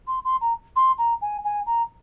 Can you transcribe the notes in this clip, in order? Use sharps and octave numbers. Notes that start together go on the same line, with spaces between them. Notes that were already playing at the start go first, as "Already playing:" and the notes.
C6
C6
A#5
C6
A#5
G#5
G#5
A#5